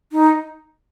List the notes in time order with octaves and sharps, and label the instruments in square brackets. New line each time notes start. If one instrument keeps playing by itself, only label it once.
[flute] D#4